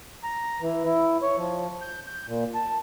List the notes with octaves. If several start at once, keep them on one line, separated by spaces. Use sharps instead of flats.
A#5
E3
E4
C#5
F3
G6
G6
A#2
A5